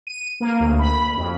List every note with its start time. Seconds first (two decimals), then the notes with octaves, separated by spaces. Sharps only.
0.07 D#7
0.40 A#3
0.60 D2
0.79 B5
1.16 F2